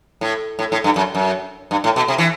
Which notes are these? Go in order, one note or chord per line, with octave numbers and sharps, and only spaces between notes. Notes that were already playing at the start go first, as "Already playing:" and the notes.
A2
A2
A2
G2
F#2
F#2
G2
A2
B2
C3
E3